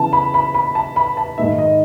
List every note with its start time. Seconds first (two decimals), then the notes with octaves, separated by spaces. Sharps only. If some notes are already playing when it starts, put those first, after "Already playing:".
Already playing: C#3 E3 B3 A5
0.13 B5
0.34 B5
0.54 B5
0.75 A5
0.96 B5
1.17 A5
1.37 G#2 D#3 G#3 D#4 E5
1.59 D#5